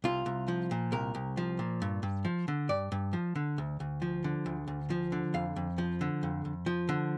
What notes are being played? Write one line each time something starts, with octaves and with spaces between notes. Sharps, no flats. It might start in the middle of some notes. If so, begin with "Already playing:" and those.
C2 F4
C2
F3
A#2
C2 A#4
C2
F3
A#2
G2
G2
F3
D3
G2 D5
G2
F3
D3
D2
D2
F3
D3
D2
D2
F3
D3
F2 F5
F2
F3
D3
F2
F2
F3
D3